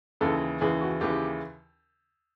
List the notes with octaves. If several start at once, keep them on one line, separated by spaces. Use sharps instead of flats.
D#2 C#3 E3 A4
D#2 C#3 E3 G#4
F#4
D#2 C#3 E3 G4